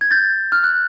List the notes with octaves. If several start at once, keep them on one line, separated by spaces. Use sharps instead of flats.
G#6
G6 A6
F6
F#6